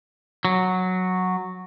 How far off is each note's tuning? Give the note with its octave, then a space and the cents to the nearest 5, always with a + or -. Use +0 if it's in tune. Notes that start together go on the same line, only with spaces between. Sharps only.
F#3 -5